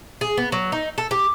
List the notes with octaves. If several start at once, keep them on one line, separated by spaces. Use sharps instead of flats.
G#4
B3
F#3
D#4
A4
G4